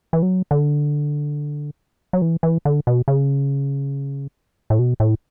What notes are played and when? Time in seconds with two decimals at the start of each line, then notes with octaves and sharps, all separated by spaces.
0.13 E3
0.22 F#3
0.51 D3
2.13 F#3
2.22 E3
2.43 E3
2.65 D3
2.87 B2
3.08 C#3
4.70 A2
4.79 B2
5.00 A2